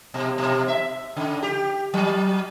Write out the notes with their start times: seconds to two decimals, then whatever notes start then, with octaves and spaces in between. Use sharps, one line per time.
0.14 B2
0.38 B2
0.68 E5
1.17 C#3
1.42 G4
1.94 F#3